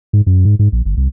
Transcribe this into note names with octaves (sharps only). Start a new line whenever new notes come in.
G#2
F#2
G#2
G#2
A#1
G1
C2